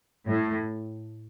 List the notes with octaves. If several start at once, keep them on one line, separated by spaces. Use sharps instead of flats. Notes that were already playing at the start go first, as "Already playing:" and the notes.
A2